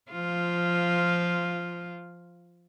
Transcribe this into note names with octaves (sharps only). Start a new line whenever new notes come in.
F3 F4